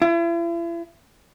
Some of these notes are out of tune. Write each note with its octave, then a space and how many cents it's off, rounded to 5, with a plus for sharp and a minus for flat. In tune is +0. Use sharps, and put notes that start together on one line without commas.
E4 +40